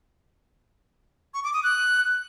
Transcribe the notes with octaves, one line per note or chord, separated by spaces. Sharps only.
C#6
D6
D#6
F#6